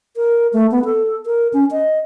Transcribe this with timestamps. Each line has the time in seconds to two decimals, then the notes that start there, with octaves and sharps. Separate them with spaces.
0.17 A#4
0.53 A3
0.71 B3
0.85 A4
1.26 A#4
1.53 C#4
1.71 D#5